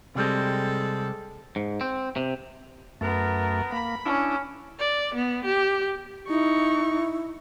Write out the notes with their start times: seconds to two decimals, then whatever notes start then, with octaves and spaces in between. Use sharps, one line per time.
0.15 C3 G3 G#3 C4 A4
1.56 G#2
1.81 C4
2.16 C3
3.01 F#2 A3 B3 A#4
3.72 A#3 B5
4.06 C#4 D4 E4
4.80 D5
5.15 B3
5.45 G4
6.29 D#4 E4 C#6